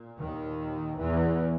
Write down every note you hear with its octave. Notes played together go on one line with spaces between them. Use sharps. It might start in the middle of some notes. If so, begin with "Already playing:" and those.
Already playing: A#2
D#2 D#3
E2 E3